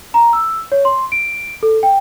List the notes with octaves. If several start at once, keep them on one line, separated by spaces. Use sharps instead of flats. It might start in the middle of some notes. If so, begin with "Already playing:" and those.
A#5
E6
C#5
C6
D7
A4
G5